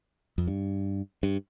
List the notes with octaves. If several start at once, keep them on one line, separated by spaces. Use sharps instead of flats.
F2
G2
G2